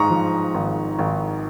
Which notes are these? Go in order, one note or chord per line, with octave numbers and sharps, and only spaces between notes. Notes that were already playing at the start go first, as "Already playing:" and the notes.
Already playing: G#2 A#5 C#6 D#6
F3
G#1
G#1